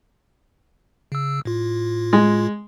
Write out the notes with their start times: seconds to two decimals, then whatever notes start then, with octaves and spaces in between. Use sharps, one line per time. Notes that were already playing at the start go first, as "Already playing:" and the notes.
1.12 C#3 E6
1.45 A2 F4
2.13 G#3